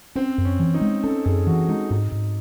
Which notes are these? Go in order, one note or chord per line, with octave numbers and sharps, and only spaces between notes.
C4 C#4
F#2
C#4
E3
D#4
G#3
C#4 A4
F#2 G#4
E3 F#4
G#3 D#4
G#2 D#4
G#2